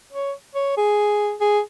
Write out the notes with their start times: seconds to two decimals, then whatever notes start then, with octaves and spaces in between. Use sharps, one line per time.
0.12 C#5
0.55 C#5
0.77 G#4
1.40 G#4